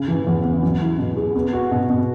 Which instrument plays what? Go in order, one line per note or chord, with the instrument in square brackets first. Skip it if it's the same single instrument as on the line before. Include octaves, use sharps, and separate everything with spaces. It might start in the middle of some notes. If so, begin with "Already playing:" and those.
Already playing: [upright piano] C#3
E3
E2
B3
F#3
E4
B2
G#4
B3
F#4
B2
B2